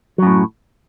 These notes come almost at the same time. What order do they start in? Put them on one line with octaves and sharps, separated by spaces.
F#3 F#2 A2